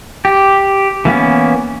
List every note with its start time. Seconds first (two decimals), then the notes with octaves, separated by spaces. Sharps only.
0.25 G4
1.05 E3 A#3 B3 C#4